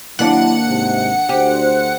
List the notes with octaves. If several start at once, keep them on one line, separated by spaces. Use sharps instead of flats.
D#2 F#3 A#3 D4 E4 F#5
G#2 C3
D2 G4 C5